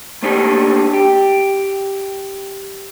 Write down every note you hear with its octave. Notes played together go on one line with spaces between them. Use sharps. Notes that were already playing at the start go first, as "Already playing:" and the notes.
A3 A#3 D4 D#4 G4 A4
G4